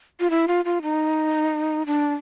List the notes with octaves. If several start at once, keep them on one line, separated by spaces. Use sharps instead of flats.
F4
E4
F4
F4
D#4
D4